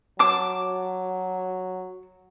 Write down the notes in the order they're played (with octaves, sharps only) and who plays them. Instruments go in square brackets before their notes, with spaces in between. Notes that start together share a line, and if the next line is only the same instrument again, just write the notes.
[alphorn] F#3 [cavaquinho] A5 D6